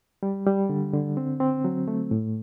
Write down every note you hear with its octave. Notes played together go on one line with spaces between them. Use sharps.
G3
G3
D3
D3
C4
C4
F#3
A3
A2